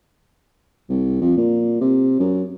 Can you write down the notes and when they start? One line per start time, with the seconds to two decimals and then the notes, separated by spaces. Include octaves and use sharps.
0.89 C2
1.21 F2
1.37 A#2
1.81 C3
2.20 F#2